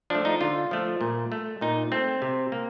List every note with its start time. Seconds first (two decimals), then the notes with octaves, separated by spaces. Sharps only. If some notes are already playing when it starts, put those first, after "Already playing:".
0.10 F3 A3 D4
0.25 D#4
0.40 D3 F4
0.71 F3 A3
1.01 A#2
1.32 A3
1.61 A#2 D#4
1.92 A3 C4
2.22 C3
2.52 A#3